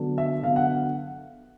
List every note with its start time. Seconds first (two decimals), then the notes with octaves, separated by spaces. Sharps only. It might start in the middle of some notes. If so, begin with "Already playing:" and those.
Already playing: D3 F#3 B3 D4
0.18 E5
0.43 D3 F#3 B3 D4 F5
0.56 F#5